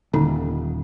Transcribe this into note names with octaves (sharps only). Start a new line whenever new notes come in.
D#1 D3 D#4